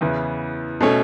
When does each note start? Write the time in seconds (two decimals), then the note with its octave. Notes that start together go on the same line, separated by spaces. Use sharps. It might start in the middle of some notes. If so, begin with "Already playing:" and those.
0.01 E2 C#3 E3 B3 E4
0.81 B2 A3 C#4